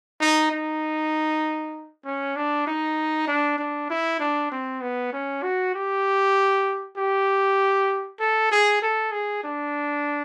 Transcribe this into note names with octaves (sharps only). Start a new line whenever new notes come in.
D#4
D#4
C#4
D4
D#4
D4
D4
E4
D4
C4
B3
C#4
F#4
G4
G4
A4
G#4
A4
G#4
D4